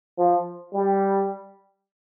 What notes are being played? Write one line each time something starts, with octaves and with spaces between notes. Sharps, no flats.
F3
G3